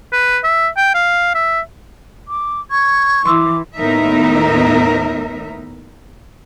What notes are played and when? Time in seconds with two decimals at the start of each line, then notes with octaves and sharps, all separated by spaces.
0.13 B4
0.44 E5
0.77 G5
0.94 F5
1.35 E5
2.28 D6
2.71 C#6 G#6
3.26 E3 C6 D6 E6
3.78 D#2 A2 B3 D#4 A#4 E5